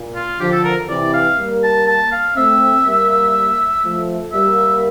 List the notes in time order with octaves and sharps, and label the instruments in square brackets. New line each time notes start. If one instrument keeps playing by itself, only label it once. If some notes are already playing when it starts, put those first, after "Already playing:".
Already playing: [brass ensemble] A#2
[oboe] F4
[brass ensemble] D3 F3 [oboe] G4
[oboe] A4
A#4
[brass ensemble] C3 E3 [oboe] D5
[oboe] F5
[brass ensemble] G3 A#3
[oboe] A5
A5
F5
[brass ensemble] A3 C4 [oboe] E5
[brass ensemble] G3 A#3
F3 A3
[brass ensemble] G3 A#3 [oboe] E5